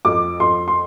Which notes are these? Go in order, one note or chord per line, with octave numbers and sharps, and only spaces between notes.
F2 D6
F2 C6
C6